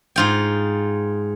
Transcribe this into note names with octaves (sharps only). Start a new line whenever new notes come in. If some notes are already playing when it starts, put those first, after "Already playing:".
G#2 F4 G5